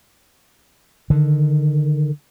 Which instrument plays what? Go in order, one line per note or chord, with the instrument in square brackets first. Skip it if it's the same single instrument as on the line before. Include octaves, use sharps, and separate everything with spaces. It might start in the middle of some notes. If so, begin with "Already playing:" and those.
[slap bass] D3 D#3